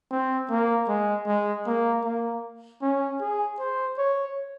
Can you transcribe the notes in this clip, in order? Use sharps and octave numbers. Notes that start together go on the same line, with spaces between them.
C4
A#3
G#3
G#3
A#3
A#3
C#4
G#4
C5
C#5